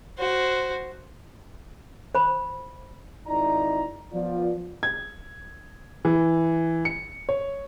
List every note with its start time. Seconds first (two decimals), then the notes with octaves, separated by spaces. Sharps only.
0.18 F#4 C5
2.15 C5 B5
3.27 G#1 D#4 E4 D5 A#5
4.13 F3 B3 F4 D5
4.83 G#6
6.05 E3
6.85 C#7
7.29 C#5